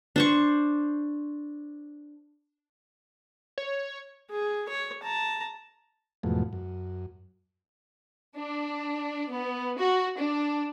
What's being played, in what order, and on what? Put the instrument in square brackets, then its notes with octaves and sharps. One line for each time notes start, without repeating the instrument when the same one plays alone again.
[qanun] D4 C5 C#6
[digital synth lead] C#5
[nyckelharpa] G#4
C#5
A5 A#5
[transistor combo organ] E2 G#2 B2 F3 F#3 A3
F#2
[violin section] D4
B3
F#4
D4